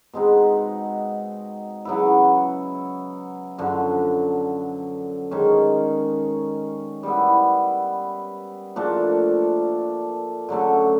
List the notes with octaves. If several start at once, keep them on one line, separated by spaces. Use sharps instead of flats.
B2 G#3 C4 D#4
C#3 F#3 B3 E4
F#2 D3 F3
D#3 G#3 C#4
G3 B3 E4
A#2 F3 A3 D4
D3 F#3 A3 C#4